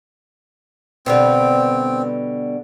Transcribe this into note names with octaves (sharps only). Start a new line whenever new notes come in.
B2 D3 G3 C4